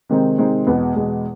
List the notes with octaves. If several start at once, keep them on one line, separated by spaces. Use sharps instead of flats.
C3 D#3 G#3 C4 D#4
C3 D#3 G#3 C4 D#4
E2 B2 G#3 B3
E2 B2 G#3 B3